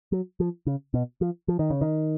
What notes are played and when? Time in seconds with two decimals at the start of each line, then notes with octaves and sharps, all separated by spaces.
0.12 F#3
0.40 F3
0.66 C#3
0.94 B2
1.21 F3
1.48 F3
1.59 D#3
1.70 C#3
1.81 D#3